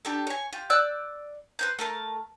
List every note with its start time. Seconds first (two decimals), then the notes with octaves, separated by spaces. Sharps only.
0.05 D4 G4 A4
0.27 C#5 G#5
0.53 F4 G4
0.70 D5 E6 F#6 G6
1.59 B4 C5 G6
1.79 A3 A#4 A5